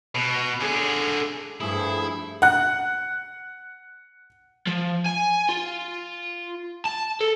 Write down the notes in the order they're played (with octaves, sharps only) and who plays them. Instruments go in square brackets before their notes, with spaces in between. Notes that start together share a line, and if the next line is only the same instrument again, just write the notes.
[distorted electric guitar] B2
D3 G#4
[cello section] G2 [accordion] F3 A3 G#4 [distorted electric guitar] E4
[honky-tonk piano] F#5 F#6
[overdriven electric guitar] F3
G#5
F4
A5
A4